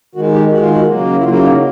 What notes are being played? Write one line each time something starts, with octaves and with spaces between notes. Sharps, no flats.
D#3 G#3 F#4
G4
D#3 G#3 F#4
F4
F#4
C#3 F#3 A#3
E4
C#3 F#3 A#3 F4
E4
D#4
E4